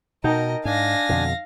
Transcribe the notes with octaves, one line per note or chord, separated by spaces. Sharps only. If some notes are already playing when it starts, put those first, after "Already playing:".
B2 D#4 A#4 D#5 G5 A5
G#2 D4 F5 G#5 A#6
F2 B2 D3